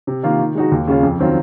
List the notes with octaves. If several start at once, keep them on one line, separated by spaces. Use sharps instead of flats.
C3
D#3 A#3 F4
D#3
G#3 D#4 F#4
D#2
C#3 G#3 C#4 F4
F2
D#3 F#3 C4 F4